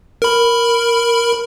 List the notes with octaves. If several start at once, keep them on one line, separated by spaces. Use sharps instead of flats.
A#4 B5